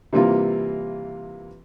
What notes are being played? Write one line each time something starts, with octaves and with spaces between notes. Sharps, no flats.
C3 E3 G3 A#3 C4 F4